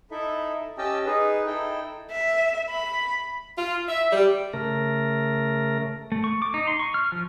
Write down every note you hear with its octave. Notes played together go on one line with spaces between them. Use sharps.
D#4 E4 A4 E5
C#4 G4 D#5 G5 A5 E6
D#4 G#4 B4
D#4 E4 A4 G5
E5
B5
F4
E5
G3
C#3 A3 A#4
A3
C#6
D6
D#4
C6
C#6
F6
F3